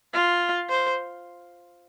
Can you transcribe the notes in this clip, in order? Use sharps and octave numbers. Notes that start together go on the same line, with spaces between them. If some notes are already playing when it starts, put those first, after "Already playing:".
F4
C5